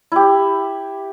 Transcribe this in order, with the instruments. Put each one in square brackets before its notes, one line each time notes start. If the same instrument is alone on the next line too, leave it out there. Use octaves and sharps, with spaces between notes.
[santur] E4 G4